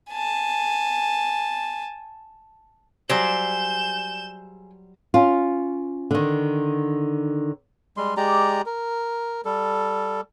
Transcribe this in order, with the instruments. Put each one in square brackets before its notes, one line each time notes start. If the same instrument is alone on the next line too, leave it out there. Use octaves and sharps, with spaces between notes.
[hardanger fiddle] G#5 A5
[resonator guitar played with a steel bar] F#3 G3 C5 [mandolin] G#4 E5 D6 [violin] G6 E7
[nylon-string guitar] C#4 F4
D3 D#3
[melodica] G3 G#3 C6
G#3 G4 D5 A#5
A#4
G3 A4